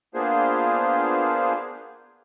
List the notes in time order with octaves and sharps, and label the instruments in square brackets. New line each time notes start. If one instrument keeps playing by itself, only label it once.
[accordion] A#3 B3 D4 F4 G#4 C5